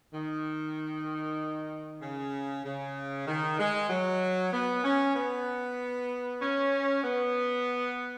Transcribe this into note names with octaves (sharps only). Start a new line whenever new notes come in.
D#3
C#3
C#3
D#3
G#3
F#3
B3
C#4
B3
C#4
B3